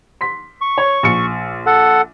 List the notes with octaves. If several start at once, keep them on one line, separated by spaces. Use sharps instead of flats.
C6 B6
C#6
C#5
A#1 C#7
A4 F#5